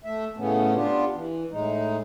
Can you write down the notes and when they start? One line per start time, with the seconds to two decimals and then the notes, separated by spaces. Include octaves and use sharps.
0.05 A3 E5
0.37 A2 C#3 E3 A3 B3 C#4
0.75 B3 D4 F4 G4
1.14 E3
1.51 A2 G#3 D#4